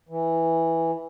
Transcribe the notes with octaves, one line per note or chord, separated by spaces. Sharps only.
E3